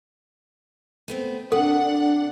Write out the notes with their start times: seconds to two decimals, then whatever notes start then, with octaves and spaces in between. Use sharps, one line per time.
1.08 A3 B3 C4
1.52 C3 D4 A4 F#5